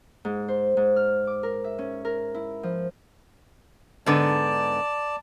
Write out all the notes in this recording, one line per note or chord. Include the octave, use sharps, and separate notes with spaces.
G#2
C5
G#2
F6
D6
A#4
E5
C#4
A#4
E4
F3
G#2 D3 B3 D5 A5